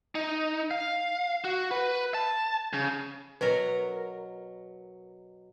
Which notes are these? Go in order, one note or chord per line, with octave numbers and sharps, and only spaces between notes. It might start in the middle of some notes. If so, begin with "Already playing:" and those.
D#4
F5
F#4
B4
A5
C#3
B2 F#3 A#4 B4